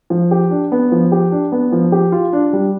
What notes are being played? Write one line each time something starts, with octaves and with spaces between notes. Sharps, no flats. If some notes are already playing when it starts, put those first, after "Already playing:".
F3
G4
D4
B3
F3
G4
D4
B3
F3
G4
F4
D4
G3